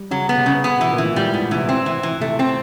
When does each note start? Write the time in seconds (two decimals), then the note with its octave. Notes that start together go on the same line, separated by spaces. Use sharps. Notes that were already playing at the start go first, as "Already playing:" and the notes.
Already playing: G3
0.11 C#3 F#3
0.29 B3
0.37 C3
0.46 C#3
0.64 B3
0.77 B2 E3
0.90 A#2
0.98 E3
1.03 A2
1.16 G#2 G3
1.29 A2 B3
1.51 C3 E3
1.69 B2 C4
1.86 E3
2.03 E3
2.20 C3 A3
2.39 C4